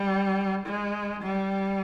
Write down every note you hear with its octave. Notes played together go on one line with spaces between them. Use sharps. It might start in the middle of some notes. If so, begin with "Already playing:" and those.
Already playing: G3
G#3
G3